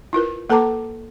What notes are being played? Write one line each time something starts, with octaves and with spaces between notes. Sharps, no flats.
E4 F4 A#4 B4
A#3 A4 B4 A5 A#5 D6